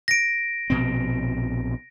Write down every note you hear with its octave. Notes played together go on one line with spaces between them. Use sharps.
A#6 D7
A#1 B2 C4